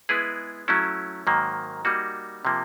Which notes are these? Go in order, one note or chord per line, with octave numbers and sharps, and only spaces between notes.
G#3 B3 E4 G#4 B4
F#3 A3 C#4 E4
G#2 D#3 F#3 A#3
G3 A#3 D#4 F#4
C3 F3 A#3